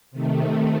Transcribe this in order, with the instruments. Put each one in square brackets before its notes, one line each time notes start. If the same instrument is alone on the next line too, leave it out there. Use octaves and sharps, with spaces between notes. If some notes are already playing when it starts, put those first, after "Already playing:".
[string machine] C3 D#3 A3